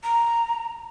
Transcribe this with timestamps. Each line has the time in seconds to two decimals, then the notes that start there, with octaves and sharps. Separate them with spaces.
0.03 A#5